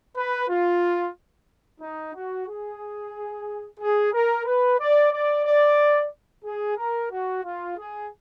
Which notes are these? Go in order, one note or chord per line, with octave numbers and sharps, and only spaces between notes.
B4
F4
D#4
F#4
G#4
G#4
A#4
B4
D5
D5
D5
G#4
A#4
F#4
F4
G#4